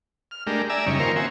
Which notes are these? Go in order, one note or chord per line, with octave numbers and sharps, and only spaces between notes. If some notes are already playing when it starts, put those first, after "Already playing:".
F6
G#3 A3 D4 G4 A#4
D5 E5 G#5 A#5 E6
F#2 C#3 G3 C#4 D#4
D#3 A#3 F4 A#4 C5 C#5
C4 F#4 E5 G#5